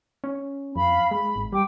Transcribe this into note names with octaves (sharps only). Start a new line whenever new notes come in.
C#4
F2 F5 B5
G#3 B5
G#1
G3 G5 D6